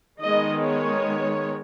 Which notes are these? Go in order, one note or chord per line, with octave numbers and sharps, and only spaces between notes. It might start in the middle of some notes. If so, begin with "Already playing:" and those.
D#3 G#3 B3 D#5
C#5